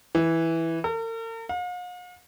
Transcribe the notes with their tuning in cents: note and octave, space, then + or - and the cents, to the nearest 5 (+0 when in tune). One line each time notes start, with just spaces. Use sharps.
E3 -5
A#4 -45
F5 +45